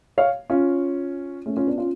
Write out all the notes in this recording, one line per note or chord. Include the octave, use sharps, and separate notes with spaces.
C#5 F5
C#4 F4
A3 C#4
C#4 F4
B3 D4
C#4 F4